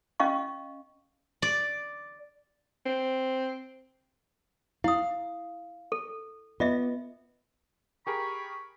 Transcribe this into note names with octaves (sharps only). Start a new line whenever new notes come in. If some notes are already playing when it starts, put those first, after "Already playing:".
C#4 D#5 F5 C#6
D5
C4
E4 F5 D#6
A4
B3 F4 D#5 E5
G4 G#4 A#4 B5 C#6